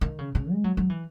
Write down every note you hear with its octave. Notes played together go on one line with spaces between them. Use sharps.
D#3
C#3
C#3
G#3
F#3
F#3
E3